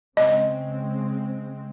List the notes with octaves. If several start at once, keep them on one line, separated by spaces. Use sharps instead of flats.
C#3 G#3 C4 D#5